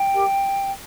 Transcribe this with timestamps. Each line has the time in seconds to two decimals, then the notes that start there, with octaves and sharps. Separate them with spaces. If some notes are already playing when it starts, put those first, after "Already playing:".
Already playing: G5
0.14 G4 A#4